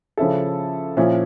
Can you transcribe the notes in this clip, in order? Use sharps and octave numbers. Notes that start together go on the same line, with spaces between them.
C#3 F3 C#4 E4 A4
A#2 F3 C#4 E4